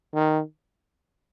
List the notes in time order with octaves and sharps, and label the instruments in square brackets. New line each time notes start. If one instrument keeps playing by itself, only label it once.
[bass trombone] D#3